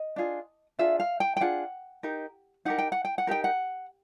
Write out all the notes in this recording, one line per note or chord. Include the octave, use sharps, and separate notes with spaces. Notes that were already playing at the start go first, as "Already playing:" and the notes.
Already playing: D#5
D4 F4 G#4
D4 F4 G#4 E5
F5
G5
G5
D4 F4 G#4 F#5
D#4 G4 A#4
D#4 G4 A#4 F#5
G5
F#5
G5
F#5
D#4 G4 A#4 G5
F#5